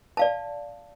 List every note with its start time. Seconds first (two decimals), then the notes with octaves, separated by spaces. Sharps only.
0.17 D5 F5 A5